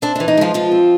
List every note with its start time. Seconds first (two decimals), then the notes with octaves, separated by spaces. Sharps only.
0.02 C4 D4
0.16 E3 D4
0.28 D#4
0.37 F3 G#3 F4
0.54 F3 G#3 F4
0.72 C4